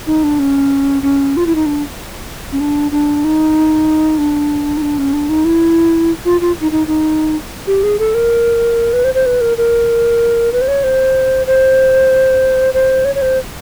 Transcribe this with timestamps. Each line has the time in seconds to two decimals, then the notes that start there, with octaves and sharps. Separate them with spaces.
0.07 D#4
0.24 D4
0.39 C#4
1.02 C#4
1.37 F4
1.47 E4
1.55 D#4
1.66 D4
2.52 C#4
2.60 D4
2.92 D4
3.24 D#4
4.18 D4
4.77 D#4
4.82 D4
4.98 C#4
5.13 D4
5.29 D#4
5.45 E4
6.25 F4
6.41 F4
6.61 D#4
6.72 D#4
6.87 D#4
7.67 G4
7.83 G#4
7.99 A4
8.14 A#4
8.93 B4
9.04 C5
9.15 C5
9.26 B4
9.41 A#4
9.58 A#4
10.53 B4
10.61 C5
10.68 C#5
10.84 C5
11.47 C5
12.74 C5
13.05 C#5
13.15 C#5
13.22 C5